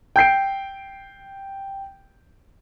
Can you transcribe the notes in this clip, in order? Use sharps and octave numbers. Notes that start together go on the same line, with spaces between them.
G5 G6 C7 D7